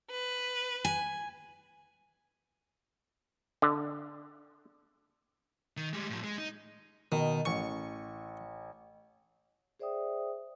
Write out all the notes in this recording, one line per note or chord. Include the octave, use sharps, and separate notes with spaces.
B4
G#5
D3
D#3
G3 G#3
A2 F3
G#3
D#4
B2 D#3
A1 C#6 C#7
G#4 C5 D5 E5 G5 D#6